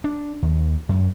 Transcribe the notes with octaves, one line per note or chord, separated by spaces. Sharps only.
D4
D#2
F#2